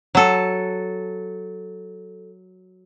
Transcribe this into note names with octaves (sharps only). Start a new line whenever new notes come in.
F#3 A4